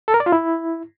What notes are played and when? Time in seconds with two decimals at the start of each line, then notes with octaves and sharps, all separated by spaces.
0.08 A4
0.14 A#4
0.20 D5
0.26 F4
0.32 E4